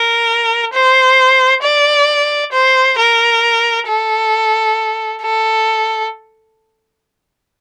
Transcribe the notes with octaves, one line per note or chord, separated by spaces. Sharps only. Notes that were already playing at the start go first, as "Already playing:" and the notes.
Already playing: A#4
C5
D5
C5
A#4
A4
A4